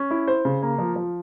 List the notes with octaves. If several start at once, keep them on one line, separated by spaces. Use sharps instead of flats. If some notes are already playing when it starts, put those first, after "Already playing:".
Already playing: C#4
E4
C5
C#3
A#3
F3
F3